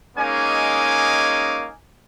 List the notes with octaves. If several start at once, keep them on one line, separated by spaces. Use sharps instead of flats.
G#3 A#3 C#4 D#4 G#5 D6